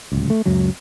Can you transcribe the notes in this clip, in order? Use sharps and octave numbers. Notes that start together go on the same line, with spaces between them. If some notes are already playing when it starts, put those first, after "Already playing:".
D1 C#2
A3
C#2 F#2 F#3